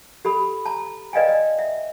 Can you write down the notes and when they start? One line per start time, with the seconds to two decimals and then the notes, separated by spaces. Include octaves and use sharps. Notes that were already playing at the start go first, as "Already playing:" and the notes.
0.25 G4 A4 B5
0.66 A5 A#5
1.13 B4 D5 D#5 F5 G5 G#5
1.28 D#5
1.59 E5